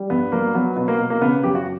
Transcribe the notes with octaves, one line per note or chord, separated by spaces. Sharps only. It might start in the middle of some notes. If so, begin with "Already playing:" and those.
Already playing: G3
G2 B3
F#3 A#3
F#3 B3
B2 B3
A#3
B2
A#3
C#3 B3
F#2 G4
F#4